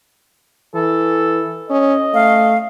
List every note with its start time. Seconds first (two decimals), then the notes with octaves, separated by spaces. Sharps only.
0.75 E3 A4
1.70 C#4 D#5
2.14 A3 F5